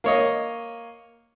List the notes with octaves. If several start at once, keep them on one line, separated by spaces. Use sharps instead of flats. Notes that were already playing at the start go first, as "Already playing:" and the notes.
A#3 C#5 D#5